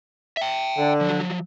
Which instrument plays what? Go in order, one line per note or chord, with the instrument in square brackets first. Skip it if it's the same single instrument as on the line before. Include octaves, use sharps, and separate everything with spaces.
[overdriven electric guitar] E5 G5
[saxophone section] D3
[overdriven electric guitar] F3 F#3